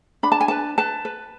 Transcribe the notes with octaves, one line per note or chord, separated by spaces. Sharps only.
D4 B5
A5
G#5
B4 A5
B4 A5
B4